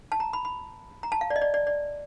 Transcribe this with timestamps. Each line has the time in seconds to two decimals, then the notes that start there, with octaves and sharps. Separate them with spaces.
0.12 A5
0.20 A#5
0.33 B5
0.45 B5
1.03 A#5
1.12 A5
1.21 F5
1.30 D5
1.36 D#5
1.42 D5
1.54 D5
1.67 D5